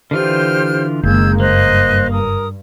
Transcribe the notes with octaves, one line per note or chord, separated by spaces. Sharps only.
D3 E3 F4 G4 C5 F6
F#1 D#3 G#3 A#3 E6 G6 G#6
G2 A#3 C5 D#5 F#6
A#4 D#6